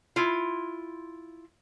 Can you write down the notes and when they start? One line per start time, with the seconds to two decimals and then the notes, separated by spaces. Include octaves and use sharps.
0.16 E4 F4